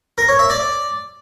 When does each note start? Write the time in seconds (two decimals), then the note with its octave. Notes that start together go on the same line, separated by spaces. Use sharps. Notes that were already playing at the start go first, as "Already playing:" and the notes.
0.18 A#4
0.29 C#5
0.39 E5
0.50 D5